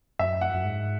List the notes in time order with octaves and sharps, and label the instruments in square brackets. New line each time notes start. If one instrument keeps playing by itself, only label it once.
[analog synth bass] F#2 [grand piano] E5
[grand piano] F#5
[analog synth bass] F#2
G#2